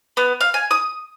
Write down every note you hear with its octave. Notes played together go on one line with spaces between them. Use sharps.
B3
F5
G#5
D#6